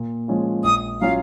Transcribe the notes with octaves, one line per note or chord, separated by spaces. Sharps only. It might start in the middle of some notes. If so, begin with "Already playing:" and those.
Already playing: A#2
F3 G#3 C#4 F4
A#1 D#6
F#3 C#4 F4 F5